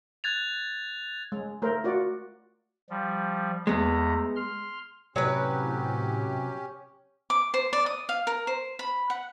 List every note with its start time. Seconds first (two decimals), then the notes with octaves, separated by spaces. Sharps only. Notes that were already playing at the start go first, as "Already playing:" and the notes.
0.24 F#6 G#6 A6 F7
1.32 G#3
1.62 A3 A#4 C5
1.84 F4 F#4 D5
2.90 F3 G3
3.67 E2 G#3 A3 B3 A#5
4.36 C6 F6
5.16 A2 C3 F#3 C#4 G4 B4
7.30 D6
7.54 C5
7.73 D5
7.86 D#6
8.09 F5
8.27 A#4
8.47 C5
8.79 B5
9.10 F#5